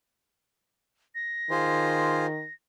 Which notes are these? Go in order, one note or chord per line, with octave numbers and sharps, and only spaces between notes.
A#6
D#3 F4 G#4 C5